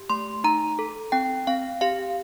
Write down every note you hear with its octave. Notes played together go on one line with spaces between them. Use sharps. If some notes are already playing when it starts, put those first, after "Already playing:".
Already playing: G4
A3 C6
D#4 A#5
A4
C4 G5
C4 F5
G4 F5